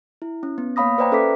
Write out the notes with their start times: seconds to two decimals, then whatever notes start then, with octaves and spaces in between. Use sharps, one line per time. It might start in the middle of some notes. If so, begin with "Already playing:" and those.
0.22 E4
0.43 C#4
0.58 B3
0.76 A#3 C#5 F5 B5 D#6 A#6
0.98 B4 C5 D5 G5 A#5
1.12 C#4 A4 B4 E5 D6 B6